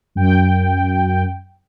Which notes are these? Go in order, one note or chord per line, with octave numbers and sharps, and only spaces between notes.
F#2 G5